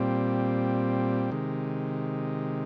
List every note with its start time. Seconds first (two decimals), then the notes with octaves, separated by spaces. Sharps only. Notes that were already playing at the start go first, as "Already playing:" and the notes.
Already playing: A#2 G3 C4
1.31 C3 D#3 G#3